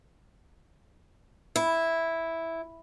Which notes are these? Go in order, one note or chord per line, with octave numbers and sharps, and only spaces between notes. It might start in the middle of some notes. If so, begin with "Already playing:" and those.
E4